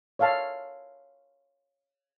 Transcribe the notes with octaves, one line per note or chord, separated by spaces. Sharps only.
C#5 E5 F5 A5